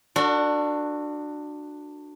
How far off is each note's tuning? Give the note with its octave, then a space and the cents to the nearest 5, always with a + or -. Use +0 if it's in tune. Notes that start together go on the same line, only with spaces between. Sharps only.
D4 +15 F#4 -15 A4 +40